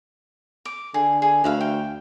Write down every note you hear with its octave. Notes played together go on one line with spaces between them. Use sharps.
D6
D3 G#4
G#4
D2 B4 E5 F5
G5